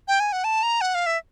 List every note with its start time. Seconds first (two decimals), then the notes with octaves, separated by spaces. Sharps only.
0.08 G5
0.20 G#5
0.33 F#5
0.44 A5
0.63 A#5
0.81 F#5
0.95 F5
1.06 E5